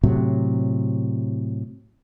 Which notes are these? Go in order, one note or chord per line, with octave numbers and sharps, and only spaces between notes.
A2 C3 F#3